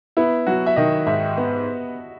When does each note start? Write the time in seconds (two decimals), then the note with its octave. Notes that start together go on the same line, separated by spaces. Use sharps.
0.17 B3 E4
0.47 F#3 F#4
0.66 E5
0.76 D#3 D#5
1.07 G#2 E5
1.37 B3